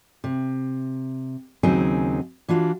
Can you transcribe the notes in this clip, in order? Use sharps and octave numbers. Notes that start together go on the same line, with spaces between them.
C3
D#2 C#3 F#3 C4 D#4 G#5
E3 D4 F4 F#4